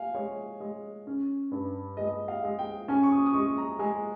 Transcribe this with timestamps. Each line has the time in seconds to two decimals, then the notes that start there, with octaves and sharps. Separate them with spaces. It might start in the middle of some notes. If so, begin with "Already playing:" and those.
Already playing: F5 G#5
0.15 G#3 C#5
0.60 G#3
1.07 C#4
1.51 G2
1.97 G#3 D#5
2.28 F5
2.44 G#3
2.59 G5
2.88 C#4 G#5
3.03 C#6
3.12 D#6
3.26 D#6
3.34 G#3 C#6
3.58 A#5
3.79 G#3 G#5